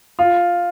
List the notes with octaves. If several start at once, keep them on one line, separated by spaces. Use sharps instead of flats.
F4